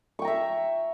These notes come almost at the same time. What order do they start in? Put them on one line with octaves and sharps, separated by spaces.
C#6 G5 A#5 E5